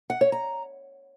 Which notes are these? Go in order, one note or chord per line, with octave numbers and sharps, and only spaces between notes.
F#5
C#5
A#5